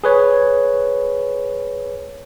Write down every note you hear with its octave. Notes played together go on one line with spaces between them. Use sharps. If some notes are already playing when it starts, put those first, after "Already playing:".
G#4 B4 C#5